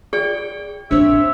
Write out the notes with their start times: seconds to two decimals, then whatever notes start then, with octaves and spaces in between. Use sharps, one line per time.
0.13 G#4 D5 G5
0.91 C4 D4 C#5 E5